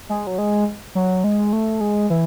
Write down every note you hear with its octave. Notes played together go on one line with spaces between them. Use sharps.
G#3
F#3
G#3
F#3
G#3
A3
G#3
E3